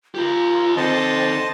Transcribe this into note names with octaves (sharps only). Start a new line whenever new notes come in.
F4 G4 A#4
D#3 C4 A4 C5 D#5 A5